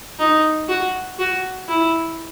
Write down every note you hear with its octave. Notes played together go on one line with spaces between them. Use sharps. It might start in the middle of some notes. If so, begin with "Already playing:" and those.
D#4
F#4
F#4
E4